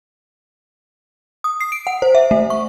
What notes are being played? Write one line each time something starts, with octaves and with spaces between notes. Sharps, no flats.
D#6
C7
D7
F#5
C5
E5
A3
C#6